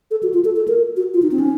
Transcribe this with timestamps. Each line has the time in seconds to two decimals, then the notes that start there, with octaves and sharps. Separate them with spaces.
0.11 A4
0.23 F#4
0.34 F4
0.45 A4
0.56 A4
0.68 A#4
0.97 F#4
1.14 F4
1.22 D#4
1.32 C4
1.40 C#4